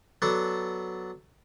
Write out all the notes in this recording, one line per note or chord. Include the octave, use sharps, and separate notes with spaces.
F#3 B3 D4 A4